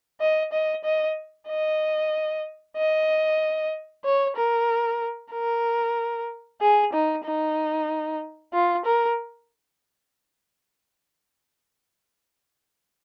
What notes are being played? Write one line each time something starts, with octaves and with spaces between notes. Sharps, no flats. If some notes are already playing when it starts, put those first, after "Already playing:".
D#5
D#5
D#5
D#5
D#5
C#5
A#4
A#4
G#4
D#4
D#4
F4
A#4